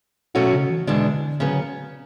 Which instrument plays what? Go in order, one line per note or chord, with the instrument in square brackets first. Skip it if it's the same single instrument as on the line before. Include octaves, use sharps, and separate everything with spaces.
[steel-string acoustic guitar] B2 F#3 A3 C#4 F#4
[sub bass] C#3
E3
[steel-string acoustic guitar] E2 B2 G#3 D4 [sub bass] D3
[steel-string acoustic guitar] C#3 F#3 B3